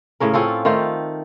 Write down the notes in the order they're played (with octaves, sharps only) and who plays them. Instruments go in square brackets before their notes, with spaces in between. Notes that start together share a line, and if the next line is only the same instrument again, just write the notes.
[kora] A2 C#3 C#4 A#4
C4 C#4 F4 A4
D#3 A3 F4 C5